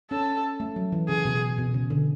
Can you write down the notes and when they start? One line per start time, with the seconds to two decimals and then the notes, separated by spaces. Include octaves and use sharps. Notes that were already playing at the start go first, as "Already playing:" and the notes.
0.11 C#4 A4
0.60 A3
0.76 F#3
0.92 E3
1.09 C#3 G#4
1.25 B2
1.58 B2
1.74 C#3
1.90 D3